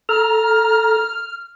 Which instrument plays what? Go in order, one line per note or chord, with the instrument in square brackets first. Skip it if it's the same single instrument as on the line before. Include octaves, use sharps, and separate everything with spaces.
[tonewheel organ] A4 A#5 [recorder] F6